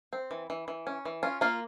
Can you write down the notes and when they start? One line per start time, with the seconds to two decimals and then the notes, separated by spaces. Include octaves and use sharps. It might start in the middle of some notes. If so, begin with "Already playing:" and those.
0.13 C4
0.31 E3
0.50 E3
0.68 E3
0.87 C#4
1.05 E3
1.23 C#4 F4
1.41 A#3 F4